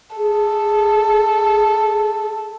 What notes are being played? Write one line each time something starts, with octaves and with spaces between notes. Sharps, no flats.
G#4 A4